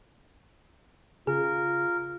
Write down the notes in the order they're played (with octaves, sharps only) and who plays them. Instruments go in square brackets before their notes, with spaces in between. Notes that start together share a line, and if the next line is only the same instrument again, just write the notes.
[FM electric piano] C#3 [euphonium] F4 [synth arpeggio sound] G#4 [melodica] A#4